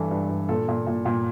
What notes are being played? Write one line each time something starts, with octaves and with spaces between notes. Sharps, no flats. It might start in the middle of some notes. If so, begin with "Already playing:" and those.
Already playing: G2 E3 A4
G2
G2
A#2 A4
A#2
A#2
A#2